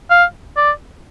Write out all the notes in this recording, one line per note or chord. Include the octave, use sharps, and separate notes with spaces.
F5
D5